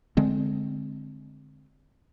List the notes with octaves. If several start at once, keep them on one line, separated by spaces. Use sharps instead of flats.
D3 G#3 C4